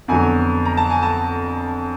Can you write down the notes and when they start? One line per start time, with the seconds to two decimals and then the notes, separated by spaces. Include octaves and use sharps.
0.08 F2 D3 F#3 B3 G#5
0.65 A#5
0.77 A5
0.90 G#5
1.03 A5